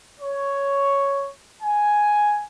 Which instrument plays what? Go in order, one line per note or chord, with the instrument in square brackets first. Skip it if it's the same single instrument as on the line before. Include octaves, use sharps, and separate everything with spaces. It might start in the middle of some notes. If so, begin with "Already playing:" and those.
[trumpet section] C#5
G#5